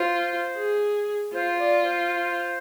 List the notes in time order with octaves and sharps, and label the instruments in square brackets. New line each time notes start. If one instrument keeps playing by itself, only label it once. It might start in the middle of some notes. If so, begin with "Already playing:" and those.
Already playing: [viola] F4 [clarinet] C5
[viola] G#4
[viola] F4 [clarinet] C5
[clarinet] D5
C5